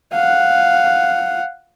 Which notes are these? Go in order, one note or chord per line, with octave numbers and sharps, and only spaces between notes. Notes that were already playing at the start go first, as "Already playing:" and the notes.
F5 F#5